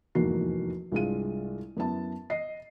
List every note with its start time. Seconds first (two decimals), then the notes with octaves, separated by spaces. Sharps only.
0.15 F1 E2 G#2 A#3 F#4 C7
0.92 C2 G2 G#3 F4 F5 D#7
1.77 F#2 B3 E4 A5
2.30 D#5 C7